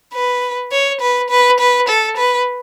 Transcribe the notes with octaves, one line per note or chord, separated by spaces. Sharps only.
B4
C#5
B4
B4
B4
A4
B4